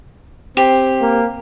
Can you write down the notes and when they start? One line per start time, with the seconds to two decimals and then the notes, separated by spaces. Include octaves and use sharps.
0.57 C4 G4
1.01 A#3